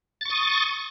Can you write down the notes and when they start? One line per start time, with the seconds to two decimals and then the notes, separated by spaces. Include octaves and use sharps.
0.21 A6
0.25 C#6
0.30 D#6